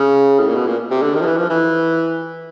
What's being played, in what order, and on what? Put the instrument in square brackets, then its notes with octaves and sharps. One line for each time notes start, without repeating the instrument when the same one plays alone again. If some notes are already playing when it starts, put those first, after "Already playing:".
Already playing: [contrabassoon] C#3
A2
A#2
B2
A#2
C3
D3
D#3
F3
E3
F3
E3